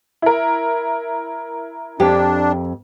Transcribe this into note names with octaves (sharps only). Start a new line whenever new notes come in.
E4 A#4
F2 D4 G4